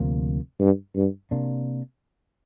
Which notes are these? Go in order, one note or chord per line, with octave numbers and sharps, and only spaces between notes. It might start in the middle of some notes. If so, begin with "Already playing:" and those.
Already playing: D2 C3 F3 A#3
G2
G2
C3 A#3 D4